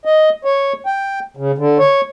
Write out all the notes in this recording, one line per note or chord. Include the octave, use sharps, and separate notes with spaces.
D#5
C#5
G5
C#3
D3
C#5